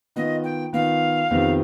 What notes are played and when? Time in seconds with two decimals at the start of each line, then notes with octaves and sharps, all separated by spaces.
0.16 D#3 B3 F4 D#5
0.44 G5
0.73 D#3 B3 F4 F5
1.31 F2 C3 D#3 B3